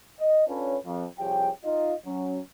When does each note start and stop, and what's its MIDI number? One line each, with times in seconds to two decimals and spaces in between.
0.19 0.45 75
0.47 0.77 61
0.47 0.77 62
0.47 0.77 65
0.47 0.77 69
0.47 0.77 71
0.47 0.77 73
0.85 1.05 41
1.18 1.50 36
1.18 1.50 53
1.18 1.50 67
1.18 1.50 68
1.18 1.50 73
1.18 1.50 79
1.64 1.94 63
1.64 1.94 65
1.64 1.94 75
2.06 2.39 54
2.06 2.39 61